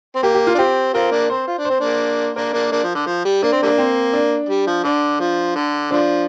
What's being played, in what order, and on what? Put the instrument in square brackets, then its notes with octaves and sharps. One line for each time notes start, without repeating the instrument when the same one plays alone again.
[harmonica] C4
[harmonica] A#3 [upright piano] G4
[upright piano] G4
F4
[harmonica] D4
[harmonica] C4 [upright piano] G4
[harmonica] C4 F4 [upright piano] A#4
[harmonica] A#3 D4
[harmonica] C4 [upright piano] C5
[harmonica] F4
D4
[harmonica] C4 [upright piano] C5
[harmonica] A#3 D4
[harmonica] A#3 D4 [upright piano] A#4
[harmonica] A#3 D4
A#3 D4
F3
D3
F3
G3
[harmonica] A#3 [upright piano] D4
[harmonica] C4
[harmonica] D3 G3 A#3 [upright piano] D4
[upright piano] C4
D4
[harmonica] G3
F3
[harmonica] D3 [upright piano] D4
[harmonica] F3
D3
[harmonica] D3 F3 [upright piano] D4